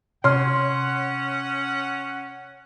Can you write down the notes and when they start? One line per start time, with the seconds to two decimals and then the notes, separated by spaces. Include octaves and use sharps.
0.24 C3 C#4 C#5 F#5 C6 F6